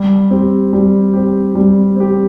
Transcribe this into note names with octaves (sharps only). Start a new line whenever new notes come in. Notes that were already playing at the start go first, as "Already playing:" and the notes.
Already playing: G3
C4 G4
G3
C4 G4
G3
C4 G4